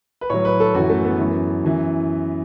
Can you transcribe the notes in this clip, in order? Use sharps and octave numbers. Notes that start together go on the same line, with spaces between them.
B4
A2 F#3 C#5
B4
A4
F#2 E3 F#4
A3
B3
F#2 E3
F#2 E3